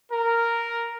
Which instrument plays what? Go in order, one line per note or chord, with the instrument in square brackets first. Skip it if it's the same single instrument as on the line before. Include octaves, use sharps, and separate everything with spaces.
[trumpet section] A#4